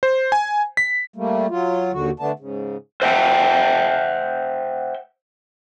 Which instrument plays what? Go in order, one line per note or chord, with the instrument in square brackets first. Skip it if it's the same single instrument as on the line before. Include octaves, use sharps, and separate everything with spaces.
[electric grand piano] C5
G#5
B6
[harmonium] G3 A3 A#3
F#3 F4
D#2 D3 F#4
D3 A3 B3 D4 A5
G#2 C#3
[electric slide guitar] C5 E5 F#5 G5